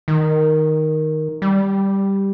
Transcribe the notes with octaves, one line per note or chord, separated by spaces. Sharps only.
D#3
G3